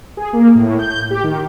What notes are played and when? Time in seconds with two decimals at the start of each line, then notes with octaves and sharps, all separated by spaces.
0.17 G#4
0.33 A#3
0.55 A2
0.79 G6
1.11 G4
1.24 D#3